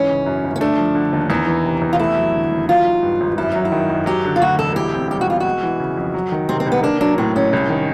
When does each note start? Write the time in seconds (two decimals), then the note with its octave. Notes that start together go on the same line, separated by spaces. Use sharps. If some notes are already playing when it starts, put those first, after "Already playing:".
Already playing: G#2 E3 C#4
0.10 C#3
0.26 F#2
0.44 G1
0.56 C#4
0.61 A3 D4
0.78 F3
0.95 D3
1.13 D#2
1.30 E2 D#4
1.47 E3
1.65 C3
1.82 E2
1.93 F4
2.00 A3 E4
2.17 F#3
2.34 D3
2.52 D#2
2.69 F#3 F4
2.85 D#3
3.03 G2
3.21 G#1
3.38 F#2 E4
3.52 F#3 D#4
3.65 E4
3.72 D#3
3.90 F#2
4.06 F#3 G4
4.25 D3
4.36 F4
4.41 D2 F#4
4.59 E1 A4
4.76 E4 G4
4.94 C4
5.11 G3 G4
5.21 F#4
5.28 B2 F4
5.40 G#3 F#4
5.63 E3
5.80 C#3
5.97 F2
6.14 F#3
6.32 D#3
6.49 C3 C4
6.60 C4
6.66 C2
6.72 B3
6.83 A#3 D4
7.01 F#3 D4
7.18 A2 C4
7.36 A1 C#4
7.53 C2
7.70 D#3